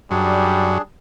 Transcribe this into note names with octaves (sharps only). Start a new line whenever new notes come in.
F#2 G3 D4 G#4